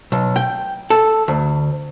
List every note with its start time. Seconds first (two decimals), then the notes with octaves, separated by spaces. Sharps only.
0.12 B1
0.36 G5
0.90 A4
1.28 D2